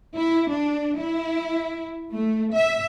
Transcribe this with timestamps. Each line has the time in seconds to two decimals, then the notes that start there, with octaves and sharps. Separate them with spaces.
0.16 E4
0.51 D4
0.98 E4
2.13 A3
2.54 E5